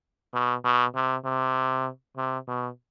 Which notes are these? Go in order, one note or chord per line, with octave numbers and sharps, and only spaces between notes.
B2
B2
C3
C3
C3
B2